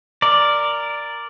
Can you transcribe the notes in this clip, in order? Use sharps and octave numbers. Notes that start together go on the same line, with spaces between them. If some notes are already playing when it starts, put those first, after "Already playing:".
A#4 D5